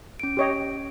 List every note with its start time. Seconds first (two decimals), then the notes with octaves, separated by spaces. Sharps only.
0.20 C#4 D7
0.37 G4 C#5 D#5